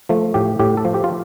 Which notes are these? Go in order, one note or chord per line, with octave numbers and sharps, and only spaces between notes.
F3 A3
A2 G4
A2 G4
A4
F3
G4
F4